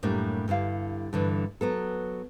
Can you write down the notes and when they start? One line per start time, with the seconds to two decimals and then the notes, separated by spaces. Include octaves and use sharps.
0.03 F#2 A2 G3 A3 A#3 D4
0.48 G2 D3 E4 F5
1.13 G2 D3 E3
1.61 F#3 B3 A4